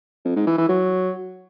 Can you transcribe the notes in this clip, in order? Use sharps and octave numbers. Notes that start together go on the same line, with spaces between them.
F2
G#2
E3
E3
F#3